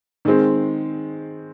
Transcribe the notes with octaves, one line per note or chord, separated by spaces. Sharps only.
D#3 G#3 C4